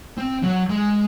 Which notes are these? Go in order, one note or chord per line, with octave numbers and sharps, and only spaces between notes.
C4
F#3
G#3